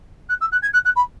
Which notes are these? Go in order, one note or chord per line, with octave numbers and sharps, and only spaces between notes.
F#6
E6
F#6
G#6
F#6
F#6
B5